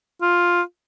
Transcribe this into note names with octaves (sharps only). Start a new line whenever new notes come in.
F4